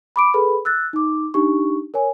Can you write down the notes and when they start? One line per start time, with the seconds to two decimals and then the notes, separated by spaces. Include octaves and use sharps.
0.16 B5 D6 D7
0.34 G#4 A4 B4 B5
0.65 E6 F#6 A6
0.93 D#4 D6
1.34 D4 D#4 G4 C#6
1.94 A#4 C#5 G#5